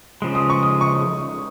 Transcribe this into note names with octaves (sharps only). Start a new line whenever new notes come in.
C#3 F3 G#3
D#6
C#6
D#6
C#6